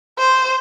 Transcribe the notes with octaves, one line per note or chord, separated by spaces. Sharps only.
C5